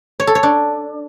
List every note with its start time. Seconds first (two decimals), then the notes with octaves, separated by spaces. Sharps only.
0.20 C#5
0.27 A4
0.35 C#5
0.43 D4